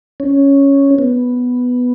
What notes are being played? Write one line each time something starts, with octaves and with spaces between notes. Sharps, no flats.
C#4
B3